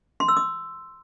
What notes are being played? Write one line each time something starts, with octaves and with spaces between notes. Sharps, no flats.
C6
E6
D#6